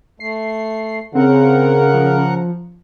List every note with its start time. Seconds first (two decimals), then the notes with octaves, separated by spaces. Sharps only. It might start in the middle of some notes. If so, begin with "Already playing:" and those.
0.20 A3 C7
1.15 C#3 C4 A#4 F#5
1.94 F3